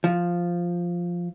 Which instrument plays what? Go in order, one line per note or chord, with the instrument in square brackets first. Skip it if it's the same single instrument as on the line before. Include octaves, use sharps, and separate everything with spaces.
[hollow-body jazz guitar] F3